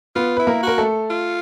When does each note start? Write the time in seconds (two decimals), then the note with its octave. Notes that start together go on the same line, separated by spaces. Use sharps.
0.16 B3 F4 B4
0.37 E4 B4
0.47 A#3 A#4
0.63 F#4 A#4
0.78 A3 A4
1.10 F4